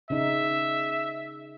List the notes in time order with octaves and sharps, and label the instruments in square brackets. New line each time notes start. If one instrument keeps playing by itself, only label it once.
[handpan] C#3 D#4 [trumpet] E5